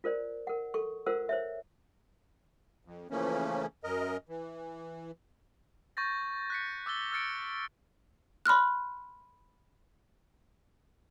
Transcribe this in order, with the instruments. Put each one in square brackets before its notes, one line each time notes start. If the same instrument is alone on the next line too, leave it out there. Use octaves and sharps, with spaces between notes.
[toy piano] F4 A#4 C5 D5
A#4 F#5
A4 C#6
F4 A#4 C5 F#5 E6
C5 C#5 E5
[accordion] F2
C#3 E3 F3 A3 A#3 C#4
F#2 A#4 D#5
E3
[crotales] C#6 G6 A6 A#6
F#6 B6 C#7
D6 E6 F#6 A6 G7
E6 F6 A6 C#7 D7
[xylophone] B5 C6 F6 F#6